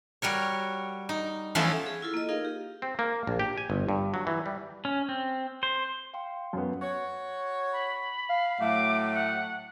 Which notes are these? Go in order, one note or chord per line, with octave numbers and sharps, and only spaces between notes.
G3 F#4 A#4 C#5
D#4
E3 F3 A3 B3 C#4 E4
G#4
E4 F4 A4
A#3 D#5
D#4 F4 G#4 A#4 F5
G4
C4
A#3
A#1
G4
G#5
G1
G2
F#3
E3
G3
C#4
C4
C5
F5 G5 C6
F#2 B3
F#4 C#5
B5
F5
A2 F#3 A3 D6
F#5